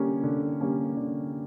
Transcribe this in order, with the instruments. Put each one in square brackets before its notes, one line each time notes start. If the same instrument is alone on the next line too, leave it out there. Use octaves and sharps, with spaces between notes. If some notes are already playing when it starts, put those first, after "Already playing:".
Already playing: [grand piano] D3 G3 A#3 C#4
D3
G3 A#3 C#4
D3